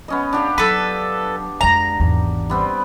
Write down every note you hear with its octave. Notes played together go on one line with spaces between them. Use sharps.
B3 C#4 D#5
D4 G4 F5
F#3 A4 B4
F2 G#3 A#5
G#1 E2
G3 B3 C4